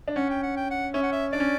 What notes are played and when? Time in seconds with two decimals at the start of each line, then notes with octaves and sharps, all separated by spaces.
0.08 D4
0.16 C#4 F#5
0.30 G5
0.43 F#5
0.57 G5
0.71 F#5
0.94 C#4 E5
1.03 F#5
1.12 E5
1.32 D4 D5
1.40 C#4